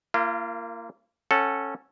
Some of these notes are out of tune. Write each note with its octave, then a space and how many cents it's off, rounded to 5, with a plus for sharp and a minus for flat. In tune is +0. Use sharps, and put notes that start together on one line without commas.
A#3 -15 F4 -45
C#4 -15 A4 +0 F#5 +0